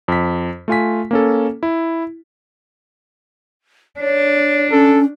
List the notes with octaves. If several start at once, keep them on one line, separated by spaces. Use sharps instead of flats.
F2 B6
A3 F4 G#5 B6
A#3 C#4 A4
E4
D4 C#5
C#4 A4